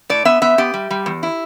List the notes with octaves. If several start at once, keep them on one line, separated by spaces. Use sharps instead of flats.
A2 D5
B3 E5
B3 E5
B3 G4
G3
G3
E2
E4